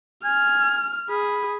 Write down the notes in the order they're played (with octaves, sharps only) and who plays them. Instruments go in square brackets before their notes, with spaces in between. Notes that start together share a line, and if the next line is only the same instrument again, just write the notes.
[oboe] G#5 [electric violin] F6
[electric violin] G#4 [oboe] B5